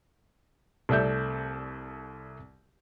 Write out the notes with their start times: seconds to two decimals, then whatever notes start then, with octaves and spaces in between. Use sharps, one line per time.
0.89 C2 A3 D5 E5 G6